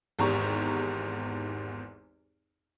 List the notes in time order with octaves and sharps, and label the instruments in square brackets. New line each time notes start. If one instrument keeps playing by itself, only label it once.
[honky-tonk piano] G#1 E2 G#2 G4 A#5 C#6